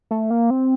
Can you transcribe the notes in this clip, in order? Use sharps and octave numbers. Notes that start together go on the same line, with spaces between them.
A3
A#3
C4